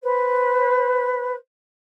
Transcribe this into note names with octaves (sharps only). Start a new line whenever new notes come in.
B4 C5